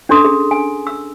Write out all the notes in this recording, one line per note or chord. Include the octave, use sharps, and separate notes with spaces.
C#4 D4 A4 C6 D#6
G#4
G#5
E6